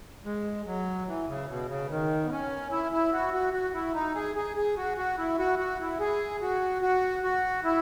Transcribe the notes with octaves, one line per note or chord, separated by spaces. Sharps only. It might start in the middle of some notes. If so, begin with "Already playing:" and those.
G#3
F#3
E3
C#3
B2
C#3
D#3
B3
C#4
E4
E4
F#4
F#4
F#4
E4
D#4
G#4
G#4
G#4
F#4
F#4
E4
F#4
F#4
E4
G#4
F#4
F#4
F#4
E4